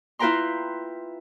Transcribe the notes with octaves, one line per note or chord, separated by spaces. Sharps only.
E4 F4 B4 G5 A#5 C6